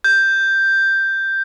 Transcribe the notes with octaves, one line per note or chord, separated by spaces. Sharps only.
G6